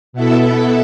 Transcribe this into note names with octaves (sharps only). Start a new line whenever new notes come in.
B2 B3 E4 A4 E5